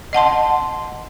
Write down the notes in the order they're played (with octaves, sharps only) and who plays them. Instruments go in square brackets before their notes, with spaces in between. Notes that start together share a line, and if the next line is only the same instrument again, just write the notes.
[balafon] D#5 F#5 A5 C6